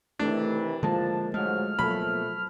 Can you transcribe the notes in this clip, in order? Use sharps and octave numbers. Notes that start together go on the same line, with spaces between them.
C3 D#3 E3 A3 D4
D3 F3 G#3 A#3 A5
G#2 F3 F#3 G#3 A3 F6
B2 F3 F#3 A3 A#3 B5